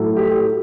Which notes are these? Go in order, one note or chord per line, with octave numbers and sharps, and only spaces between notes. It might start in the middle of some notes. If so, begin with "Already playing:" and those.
Already playing: A2 F#3 A3
G4